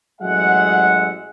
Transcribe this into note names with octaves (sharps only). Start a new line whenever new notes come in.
A1 F#3 G#3 E5 F#5